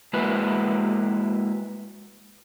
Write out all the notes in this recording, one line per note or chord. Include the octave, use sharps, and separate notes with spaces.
G#3 A#3 E4 F#4 B4